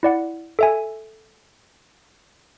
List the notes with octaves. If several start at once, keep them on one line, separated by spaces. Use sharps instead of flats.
E4 D5 F#5
A4 E5 G#5